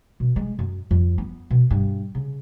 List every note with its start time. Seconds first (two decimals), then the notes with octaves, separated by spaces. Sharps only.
0.20 B2
0.36 G#3
0.59 F#2
0.91 F2
1.18 B3
1.51 B2
1.71 G2
2.15 C#3